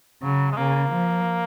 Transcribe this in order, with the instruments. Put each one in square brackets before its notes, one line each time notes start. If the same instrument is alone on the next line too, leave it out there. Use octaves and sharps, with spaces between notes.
[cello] C#3 [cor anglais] F#3
[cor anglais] G#3
[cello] C#3 [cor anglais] A#3
[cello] F3